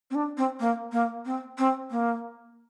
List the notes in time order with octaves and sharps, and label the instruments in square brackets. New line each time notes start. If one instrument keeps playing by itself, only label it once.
[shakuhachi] C4
D4
C4
A#3
A#3
C4
C4
A#3